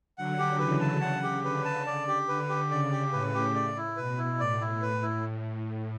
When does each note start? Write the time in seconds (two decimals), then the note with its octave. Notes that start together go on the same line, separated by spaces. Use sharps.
0.18 D3 F#3 F#5
0.39 G4
0.59 C#3 E3 B4
0.81 A5
1.01 C#3 F#5
1.23 G4
1.44 D3 B4
1.65 A5
1.86 D5
2.08 G4
2.28 D3 B4
2.49 G4
2.70 C#3 D5
2.91 G4
3.12 A2 B4
3.34 G4
3.55 D5
3.77 E4
3.97 B2 B4
4.18 E4
4.39 A2 D5
4.61 E4
4.82 B4
5.03 E4